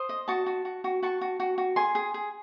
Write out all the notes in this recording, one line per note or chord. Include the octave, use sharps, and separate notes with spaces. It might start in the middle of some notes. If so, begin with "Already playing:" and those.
Already playing: C5 C6 D#6
D#5
F#4 A5 C#6
F#4
F#4
F#4
F#4 A5 C#6
F#4
F#4
F#4
G#4 G#5 C6
G#4
G#4